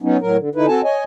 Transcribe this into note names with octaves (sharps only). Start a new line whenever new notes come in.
F#3 B3 C#4 D#4
A2 F#3 A#4
D3
D3 D#4 E4 B4
C4 F#4 A4 G#5 A5
C#5 D#5 G#5